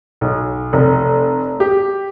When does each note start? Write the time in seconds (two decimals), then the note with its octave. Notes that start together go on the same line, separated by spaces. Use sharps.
0.21 B1
0.73 F1
1.60 G4